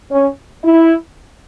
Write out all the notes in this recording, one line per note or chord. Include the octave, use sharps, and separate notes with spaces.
C#4
E4